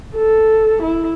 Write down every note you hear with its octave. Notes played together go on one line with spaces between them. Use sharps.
A4
E4